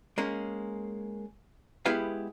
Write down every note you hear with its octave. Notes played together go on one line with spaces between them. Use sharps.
G#3 A#3 C#4
G#3 B3 E4 G4 B4 F5